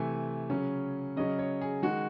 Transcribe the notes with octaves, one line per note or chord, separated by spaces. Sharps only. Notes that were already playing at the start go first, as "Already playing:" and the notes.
Already playing: C3 E3 A3 G#5
C#3 F#3 C#4
C#3 F#3 C#4 D#5
C#5
G#4
D#3 G#3 F#4